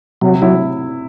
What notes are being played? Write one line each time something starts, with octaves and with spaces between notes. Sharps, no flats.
C3 F#3
F#3 E4